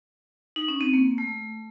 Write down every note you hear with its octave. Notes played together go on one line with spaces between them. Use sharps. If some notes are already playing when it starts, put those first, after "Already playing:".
D#4
C#4
C4
A#3
A3